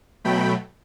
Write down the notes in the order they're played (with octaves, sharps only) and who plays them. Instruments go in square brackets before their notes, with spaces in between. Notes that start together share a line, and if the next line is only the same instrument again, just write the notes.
[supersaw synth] B2 F#3 A3 G5 B5